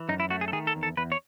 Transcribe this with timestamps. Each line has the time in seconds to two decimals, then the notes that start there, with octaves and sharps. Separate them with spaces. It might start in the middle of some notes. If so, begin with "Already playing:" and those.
Already playing: E3
0.09 F#2 D#4
0.20 E4
0.30 A3 F#4
0.41 G#4
0.48 A4
0.52 D#3 G#4
0.67 A4
0.76 E2
0.83 A4
0.97 E2 B4
1.12 C#5